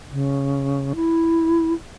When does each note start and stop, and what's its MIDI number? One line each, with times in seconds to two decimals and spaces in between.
0.12 0.93 49
0.96 1.73 64